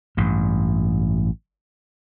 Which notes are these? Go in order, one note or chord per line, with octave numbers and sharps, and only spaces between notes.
A1 G2